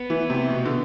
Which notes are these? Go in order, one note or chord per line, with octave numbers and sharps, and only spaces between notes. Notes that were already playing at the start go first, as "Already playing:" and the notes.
Already playing: B3
E3
C3
B2
D3